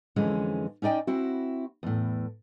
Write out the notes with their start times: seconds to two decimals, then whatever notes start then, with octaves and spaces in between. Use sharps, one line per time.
0.16 F2 D3 E3 G#3 C#4
0.82 C#4 D#4 D5 D#5 G5
1.07 C4 E4 F#4
1.83 E2 A2